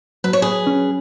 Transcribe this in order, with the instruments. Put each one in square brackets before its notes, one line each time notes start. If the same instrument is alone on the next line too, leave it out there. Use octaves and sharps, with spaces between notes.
[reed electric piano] F#3 [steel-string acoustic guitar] B4
[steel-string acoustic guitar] C#5
G#4 B4
[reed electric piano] C#4